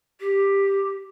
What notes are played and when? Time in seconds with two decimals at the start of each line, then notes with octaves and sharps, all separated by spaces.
0.20 G4